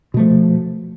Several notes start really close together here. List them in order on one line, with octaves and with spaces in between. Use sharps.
B2 A3 F3